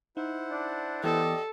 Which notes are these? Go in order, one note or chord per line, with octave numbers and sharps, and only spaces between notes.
D#4 E4 C5 F#5
D4
E3 B3 G4 A4 D5 D#5